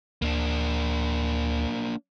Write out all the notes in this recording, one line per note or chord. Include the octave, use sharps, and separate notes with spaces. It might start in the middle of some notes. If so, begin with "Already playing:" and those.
D2 A#3 D4